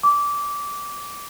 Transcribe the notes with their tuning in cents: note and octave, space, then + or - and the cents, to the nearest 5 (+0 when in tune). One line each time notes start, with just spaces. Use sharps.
D6 -20